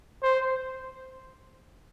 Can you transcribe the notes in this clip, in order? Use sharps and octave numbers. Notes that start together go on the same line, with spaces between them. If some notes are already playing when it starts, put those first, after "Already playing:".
C5